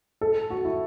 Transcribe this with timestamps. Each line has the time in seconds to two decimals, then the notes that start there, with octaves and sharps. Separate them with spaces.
0.21 A4
0.50 F#4
0.65 E4